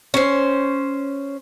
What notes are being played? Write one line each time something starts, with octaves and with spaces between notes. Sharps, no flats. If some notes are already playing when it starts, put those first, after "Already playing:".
C#4 C5